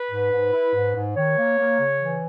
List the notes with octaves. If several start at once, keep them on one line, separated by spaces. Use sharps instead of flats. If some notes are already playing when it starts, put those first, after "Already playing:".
Already playing: B4
G#2
G#2
E4
G#2
G#2
D#3 C#5
A#3
A#3
C#3
E3